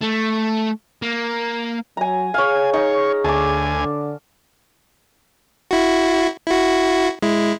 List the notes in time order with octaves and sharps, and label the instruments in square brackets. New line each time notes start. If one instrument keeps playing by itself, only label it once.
[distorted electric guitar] A3
A#3
[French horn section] F#3 [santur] G#5 A#5
[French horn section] G#4 [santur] C#5 F5 [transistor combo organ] G#5
[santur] D#4 [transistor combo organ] C#5
[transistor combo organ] D2 G#5 [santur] A5 D6
[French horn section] D3
[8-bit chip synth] E4 F#4
E4 F#4
G#3 E4